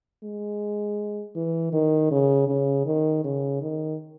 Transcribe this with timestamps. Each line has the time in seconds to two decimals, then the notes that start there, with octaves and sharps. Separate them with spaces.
0.24 G#3
1.36 E3
1.73 D#3
2.11 C#3
2.48 C#3
2.86 D#3
3.24 C#3
3.62 D#3